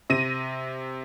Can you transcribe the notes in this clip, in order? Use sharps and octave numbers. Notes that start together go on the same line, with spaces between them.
C3 A#6 D#7